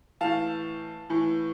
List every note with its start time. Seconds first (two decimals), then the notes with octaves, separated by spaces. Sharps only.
0.21 A2 E3 F5 A5
1.10 A2 E3